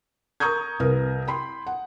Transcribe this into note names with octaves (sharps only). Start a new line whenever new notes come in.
A#4 A#5 C#6 D#6 G6 G#6
C2 A#4 B4
G5 B5 C6
F#5